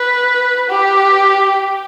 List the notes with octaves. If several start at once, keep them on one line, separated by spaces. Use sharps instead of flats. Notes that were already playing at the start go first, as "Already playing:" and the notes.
Already playing: B4
G4